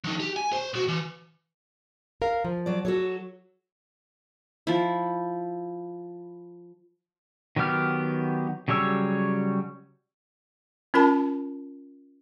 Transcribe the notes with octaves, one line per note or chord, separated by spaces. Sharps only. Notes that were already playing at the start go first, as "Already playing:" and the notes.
F3 D#4
G4
G#5
C5
B1 F#4
E3
A#4 F5
F3
F#3 D5
F#3 F#4 A4 C#5
F3 E4
D#3 F#3 B3 G4 F6
C#3 F#3 G3 C#5 E6
C#4 F4 A#4 A5 B5